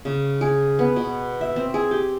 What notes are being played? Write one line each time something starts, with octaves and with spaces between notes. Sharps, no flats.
C#3
G#4
B3
B2
E5
C4
G#4
G4